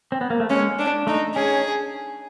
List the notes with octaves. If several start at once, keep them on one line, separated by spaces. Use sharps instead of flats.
C4
B3
A#3
A3
G#3 C#4
D4
A3 D#4
C#4 G#4